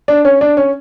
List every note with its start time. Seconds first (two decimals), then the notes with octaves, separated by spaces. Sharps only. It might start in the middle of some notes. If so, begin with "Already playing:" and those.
0.08 D4
0.25 C#4
0.41 D4
0.57 C#4